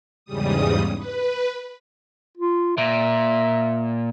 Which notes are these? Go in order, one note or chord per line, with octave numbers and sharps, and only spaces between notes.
E2 G#2 C#3 G3 D#6
B4
F4
A#2 E5